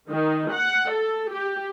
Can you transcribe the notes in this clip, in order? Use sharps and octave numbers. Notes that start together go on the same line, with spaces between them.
D#3
F#5
A4
G4